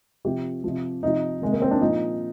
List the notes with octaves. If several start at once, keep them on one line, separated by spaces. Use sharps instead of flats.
C3 F3 G4
C3 F3
C3 F3 D#4
C3 D#3 G#3
A#3
C4
D4
A#2 F3 D#4